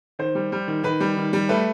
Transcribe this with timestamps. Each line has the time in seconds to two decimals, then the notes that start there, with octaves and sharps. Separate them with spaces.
0.19 D#3 C5
0.35 G3
0.52 G3
0.68 D#3
0.83 D#3 B4
1.00 G3
1.17 D#3
1.33 G3
1.49 A3 B4